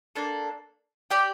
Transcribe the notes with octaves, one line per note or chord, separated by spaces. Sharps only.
A#3 D4 A4
G4 D5 G5